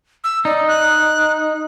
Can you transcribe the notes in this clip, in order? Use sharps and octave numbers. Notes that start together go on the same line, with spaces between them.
E6
D#4 D5
F#6